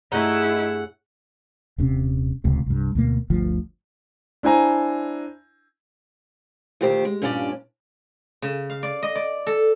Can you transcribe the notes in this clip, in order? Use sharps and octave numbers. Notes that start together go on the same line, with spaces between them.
G2 A3 D#4 E4 G#4 C#5 F#5
D#1 C3 C#4
D1 C#2 C3
C2 G2
D2 B2 A#3
G1 D2 F3
D4 E4 C5 G#5 A#5
D2 A#2 D#3 G4 C5
G#3
G2 A#2 C#4 D4 E4 D5
C#3
F5
D5
D#5
D5
A4